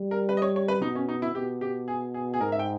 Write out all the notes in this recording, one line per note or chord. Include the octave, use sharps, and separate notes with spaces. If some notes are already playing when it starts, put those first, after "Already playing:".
Already playing: G3
A#4
B4
D#5
C#5
C#5
B4
B2 D#4
C#4
D#4
E4
B2 G4
G4
G#4
G#4
G#4
G#2 A#4
E5
G5